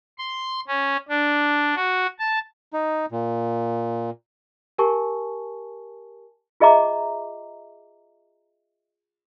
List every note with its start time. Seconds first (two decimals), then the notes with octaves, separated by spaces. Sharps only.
0.19 C6
0.67 C#4
1.09 D4
1.76 F#4
2.19 A5
2.73 D#4
3.12 A#2
4.78 G4 A#4 G#5 A5 C#6
6.60 F4 G#4 D#5 E5 A#5 D6